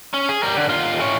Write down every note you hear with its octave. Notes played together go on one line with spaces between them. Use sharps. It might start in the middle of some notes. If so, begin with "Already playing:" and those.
C#4
G#4
G3 A#4
D3
D#2 F4
E3 C#5